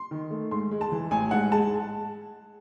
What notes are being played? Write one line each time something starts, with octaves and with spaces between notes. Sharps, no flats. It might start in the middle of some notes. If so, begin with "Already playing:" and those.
Already playing: C6
D#3
A3
G#2 C6
G#3
A5
E3
A1 G#5
G#2 F#5
G#3 A5